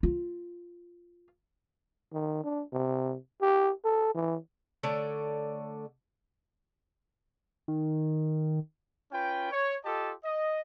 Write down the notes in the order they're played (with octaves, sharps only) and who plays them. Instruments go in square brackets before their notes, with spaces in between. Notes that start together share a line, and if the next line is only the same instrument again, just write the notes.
[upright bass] F4
[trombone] D#3
D4
C3
G4
A4
E3
[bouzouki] D3 A3 C#5 D5
[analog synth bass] D#3
[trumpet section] C#4 F4 B4 G5
C#5
F4 G4 A4 D#5 A5
D#5